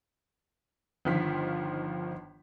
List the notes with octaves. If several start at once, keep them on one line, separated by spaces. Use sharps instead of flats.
G1 D#3 F3 F4 B6